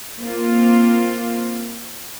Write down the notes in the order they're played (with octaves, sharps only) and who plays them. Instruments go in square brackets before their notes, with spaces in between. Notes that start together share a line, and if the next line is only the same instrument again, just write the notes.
[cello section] A#3 C4 F4